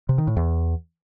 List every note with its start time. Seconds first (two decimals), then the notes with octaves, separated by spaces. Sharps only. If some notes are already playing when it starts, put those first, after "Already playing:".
0.09 C3
0.18 D#3
0.27 A2
0.37 E2